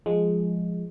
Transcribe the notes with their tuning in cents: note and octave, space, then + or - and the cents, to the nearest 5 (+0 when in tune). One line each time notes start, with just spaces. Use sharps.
F3 +0 G#3 +0